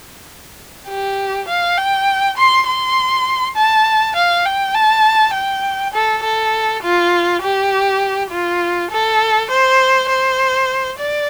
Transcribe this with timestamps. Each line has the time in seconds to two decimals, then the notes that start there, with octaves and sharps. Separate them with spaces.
0.88 G4
1.48 F5
1.77 G5
2.37 C6
2.67 C6
3.56 A5
4.16 F5
4.45 G5
4.74 A5
5.34 G5
5.93 A4
6.24 A4
6.83 F4
7.42 G4
8.31 F4
8.91 A4
9.50 C5
10.09 C5
10.99 D5